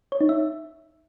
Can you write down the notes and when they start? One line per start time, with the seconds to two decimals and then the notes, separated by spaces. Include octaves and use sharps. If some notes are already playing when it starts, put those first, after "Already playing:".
0.12 C#5
0.21 D#4
0.29 E5